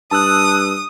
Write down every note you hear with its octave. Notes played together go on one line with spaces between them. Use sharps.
G2 A5 D#6 E6 F#6